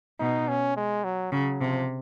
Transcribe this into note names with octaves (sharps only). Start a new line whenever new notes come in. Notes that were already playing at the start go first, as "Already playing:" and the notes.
B2 D#4
C#4
G#3
F#3
C#3 F#3
C3 F3